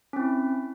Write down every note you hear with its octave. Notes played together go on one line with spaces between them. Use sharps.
C4 C#4 E4